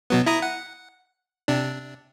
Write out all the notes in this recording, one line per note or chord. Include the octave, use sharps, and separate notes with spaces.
B2 F#3 B3
E4 A#5 D#6
F#5
C3 D4